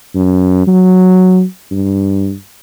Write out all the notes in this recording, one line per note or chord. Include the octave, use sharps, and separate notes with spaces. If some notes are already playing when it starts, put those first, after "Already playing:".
F#2
F#3
G2